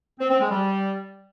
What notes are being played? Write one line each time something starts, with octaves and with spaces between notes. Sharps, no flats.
C4
C4
G#3
G3